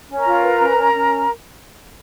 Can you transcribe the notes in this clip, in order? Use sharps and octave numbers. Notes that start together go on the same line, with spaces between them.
C#4
A#4 A#5
F4
B4
C#4
C#4
C#4